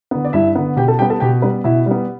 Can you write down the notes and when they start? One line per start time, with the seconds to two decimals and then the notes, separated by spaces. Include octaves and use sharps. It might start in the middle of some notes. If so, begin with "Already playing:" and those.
0.11 D3 B3
0.25 D5
0.33 G2 E4 E5
0.55 D3 B3
0.76 B2 G4 G5
0.88 A4 A5
0.98 G3 B3 G4 G5
1.10 A4 A5
1.20 B2 G4 G5
1.42 G3 B3 B4
1.64 B2 E4 E5
1.86 G3 B3